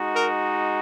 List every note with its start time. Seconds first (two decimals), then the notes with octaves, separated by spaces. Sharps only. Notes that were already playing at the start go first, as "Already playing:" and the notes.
Already playing: G#3 D#4 F#4
0.16 A#4